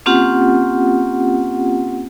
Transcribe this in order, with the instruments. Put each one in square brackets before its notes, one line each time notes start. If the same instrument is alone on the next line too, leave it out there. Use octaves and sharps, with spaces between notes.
[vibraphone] A#3 C4 C#4 F4 G4 F#5